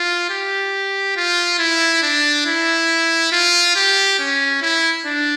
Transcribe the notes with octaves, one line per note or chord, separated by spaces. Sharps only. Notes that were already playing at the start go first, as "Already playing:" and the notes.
Already playing: F4
G4
F4
E4
D4
E4
F4
G4
C#4
E4
D4